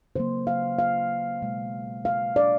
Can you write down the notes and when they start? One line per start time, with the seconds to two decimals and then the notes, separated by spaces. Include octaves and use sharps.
0.16 C#3 F#3 A#3 C5
0.47 F5
0.79 F5
1.42 B2 G#3
2.05 F5
2.36 D5